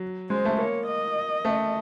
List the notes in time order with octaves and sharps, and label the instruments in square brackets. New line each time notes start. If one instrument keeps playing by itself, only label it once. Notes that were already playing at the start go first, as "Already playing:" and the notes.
Already playing: [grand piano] F#3
[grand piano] G#3 [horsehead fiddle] C5
[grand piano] A3
[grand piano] A#3 [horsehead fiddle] C#5
[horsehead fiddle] D#5
[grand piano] A3